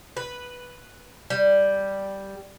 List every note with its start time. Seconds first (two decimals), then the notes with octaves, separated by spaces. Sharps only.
0.17 B4
1.30 G3